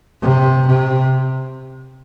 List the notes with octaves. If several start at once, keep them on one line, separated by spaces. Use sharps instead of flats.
C3
C3